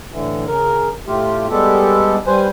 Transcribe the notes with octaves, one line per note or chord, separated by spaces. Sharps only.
A2 D3 E3
C#3 A#4
A2 A3 F4 G4
G3 G#3 B3 G4 A4
G3 B4 C5 G#5